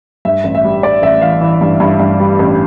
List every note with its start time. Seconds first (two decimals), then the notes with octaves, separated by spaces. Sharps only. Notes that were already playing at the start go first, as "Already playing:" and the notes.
0.25 G2 E5
0.44 A1
0.55 E5
0.64 G3
0.83 G3 D5
1.03 A1 E5
1.21 E3 F5
1.41 E3
1.61 G2
1.80 G2
2.00 G2
2.20 G3
2.39 A1